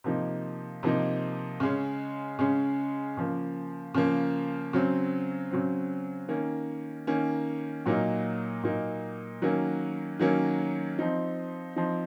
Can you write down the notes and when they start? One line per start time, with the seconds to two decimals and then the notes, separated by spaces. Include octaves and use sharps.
0.04 C3 F3 A#3 D#4
0.83 C3 F3 A#3 D#4
1.60 C#3 G#3 C#4
2.39 C#3 G#3 C#4
3.17 C#3 F3 A#3
3.94 C#3 F3 A#3
4.73 C#3 F#3 C4
5.51 C#3 F#3 C4
6.29 D#3 A#3 C#4
7.07 D#3 A#3 C#4
7.86 A#2 F#3 A#3 D#4
8.63 A#2 F#3 A#3 D#4
9.42 D#3 F#3 A#3 C#4
10.20 D#3 F#3 A#3 C#4
10.99 F3 C4 D#4
11.76 F3 C4 D#4